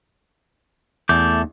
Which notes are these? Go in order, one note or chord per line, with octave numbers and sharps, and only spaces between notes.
E2 A3 D6 G6